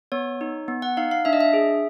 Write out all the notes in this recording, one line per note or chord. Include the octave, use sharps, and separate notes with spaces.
B3 C#5
D#4
B3
F#5
D#4 F5
F5
D4 E5
D#5
E5
G#4